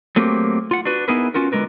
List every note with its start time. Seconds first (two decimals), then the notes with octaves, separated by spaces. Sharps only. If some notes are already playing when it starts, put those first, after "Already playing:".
0.16 F#3 A3 A#3 C4 G4
0.71 F4 F#5
0.85 D4 F#4 B4
1.08 B3 D#4 E4 G#4 A#4 B4
1.34 C#4 F4 F#4 A#4
1.52 D3 G#3 F#4 A#4 B4